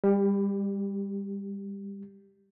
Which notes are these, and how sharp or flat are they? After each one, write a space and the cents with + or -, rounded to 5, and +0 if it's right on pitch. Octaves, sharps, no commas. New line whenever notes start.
G3 +30 G4 +0